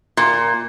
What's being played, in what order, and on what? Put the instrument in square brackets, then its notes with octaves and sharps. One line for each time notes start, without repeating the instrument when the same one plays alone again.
[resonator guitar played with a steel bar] A#2